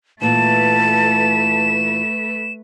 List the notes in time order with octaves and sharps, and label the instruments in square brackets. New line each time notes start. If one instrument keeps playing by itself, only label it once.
[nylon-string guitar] A#2 E3 [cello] A3 B4 [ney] A5 [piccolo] E7